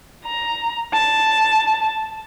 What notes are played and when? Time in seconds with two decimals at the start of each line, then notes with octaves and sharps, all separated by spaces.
0.25 A#5
0.93 A5